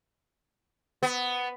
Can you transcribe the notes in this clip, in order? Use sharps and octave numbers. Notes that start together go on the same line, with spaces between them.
B3